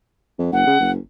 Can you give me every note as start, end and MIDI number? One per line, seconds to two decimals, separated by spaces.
0.39 0.52 41
0.53 0.63 30
0.53 0.91 78
0.67 0.77 49
0.80 0.97 30